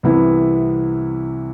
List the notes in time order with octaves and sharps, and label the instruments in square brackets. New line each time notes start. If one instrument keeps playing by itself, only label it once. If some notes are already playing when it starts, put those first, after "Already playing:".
[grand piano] C2 C3 E3 B3 E4